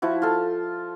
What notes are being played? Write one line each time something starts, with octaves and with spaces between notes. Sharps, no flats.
F3 E4 F#4
F4 A4